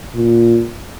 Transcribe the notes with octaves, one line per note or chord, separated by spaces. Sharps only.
A#2